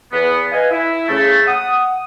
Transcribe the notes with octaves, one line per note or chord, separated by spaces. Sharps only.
E2 B3
B4 D#5 F5 G#5
E4
C#3 A3
F#5 D#6